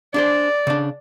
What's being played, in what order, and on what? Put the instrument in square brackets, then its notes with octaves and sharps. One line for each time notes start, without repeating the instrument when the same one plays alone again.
[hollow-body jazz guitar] D4 G#4 C5 [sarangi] D5
[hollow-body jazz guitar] C#3 D4